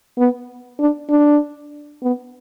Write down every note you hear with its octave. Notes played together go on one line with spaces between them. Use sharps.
B3
D4
D4
B3